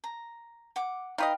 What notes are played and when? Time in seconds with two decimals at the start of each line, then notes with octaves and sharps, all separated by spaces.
0.04 A#5
0.76 F#5 D6
1.18 D#4 B4 D#5 F5 G5